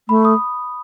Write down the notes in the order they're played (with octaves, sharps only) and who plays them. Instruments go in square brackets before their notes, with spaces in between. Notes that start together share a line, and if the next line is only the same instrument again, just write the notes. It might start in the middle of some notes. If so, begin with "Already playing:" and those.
[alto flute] A3 [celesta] B5
[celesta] D#6